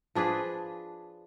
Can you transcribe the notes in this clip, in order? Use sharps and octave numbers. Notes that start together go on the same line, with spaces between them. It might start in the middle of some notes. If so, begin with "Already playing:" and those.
F3 D4 G#4 B4